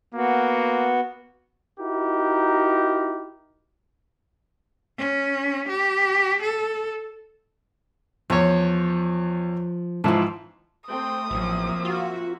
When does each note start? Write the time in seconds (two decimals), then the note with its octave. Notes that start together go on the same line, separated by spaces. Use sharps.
0.15 A#3 B3 F#4
1.80 D#4 E4 F#4 G4 A#4
4.98 C#4
5.68 G4
6.42 A4
8.30 E2 F3 C#5
10.04 G#2 E3 F3 F5 A5
10.88 A3 C4 G5 D#6
11.31 A1 F3 F#3 A#3 C4 E5
11.85 F4 F#4